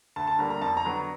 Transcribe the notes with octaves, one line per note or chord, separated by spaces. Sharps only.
D2 A5
A5
D3 G3 A#3 A#5
A#5
F2 A5
A#5
D3 F#3 B3